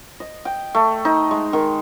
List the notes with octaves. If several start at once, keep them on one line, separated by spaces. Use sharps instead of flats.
D#5
G5
A3
D#4
G#3
D#3